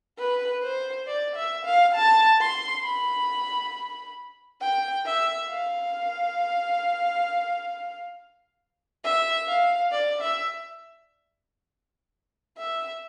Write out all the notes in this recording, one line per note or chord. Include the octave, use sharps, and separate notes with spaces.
B4
C5
D5
E5
F5
A5
C6
B5
G5
E5
F5
E5
F5
D5
E5
E5